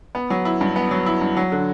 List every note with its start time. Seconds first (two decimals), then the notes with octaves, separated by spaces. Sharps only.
0.15 B3
0.30 F#3
0.45 E4
0.61 G2
0.76 B3
0.91 F#3
1.06 E4
1.21 G2
1.37 F#3
1.52 D3